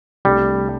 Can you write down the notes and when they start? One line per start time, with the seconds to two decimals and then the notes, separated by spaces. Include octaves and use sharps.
0.25 C2 C3 G3 A3 D4